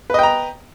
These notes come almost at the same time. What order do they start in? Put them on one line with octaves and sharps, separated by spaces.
B4 D#5 G5 A#5